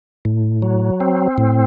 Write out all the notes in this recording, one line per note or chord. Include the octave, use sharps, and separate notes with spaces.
A2
F#3
C4
A2